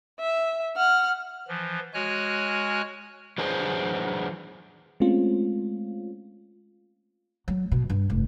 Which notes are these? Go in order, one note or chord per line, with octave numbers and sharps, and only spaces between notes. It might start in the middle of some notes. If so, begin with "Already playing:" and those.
E5
F#5 F6
E3 F3
G#3 F#4 C#5 G#5 F6 F#6
E3 F#3 D4 G#4 A#4 C5
G#3 A3 C4 C#4 F4
F#3
B2
G2
F1